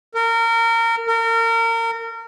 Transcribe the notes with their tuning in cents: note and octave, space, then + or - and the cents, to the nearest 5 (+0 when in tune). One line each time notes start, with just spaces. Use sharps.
A#4 -25
A#4 -30